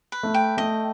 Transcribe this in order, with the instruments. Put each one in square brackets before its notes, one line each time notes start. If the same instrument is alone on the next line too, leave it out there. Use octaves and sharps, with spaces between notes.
[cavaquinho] B4
[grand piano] A3
[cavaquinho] G5
[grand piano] A3 [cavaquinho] D#5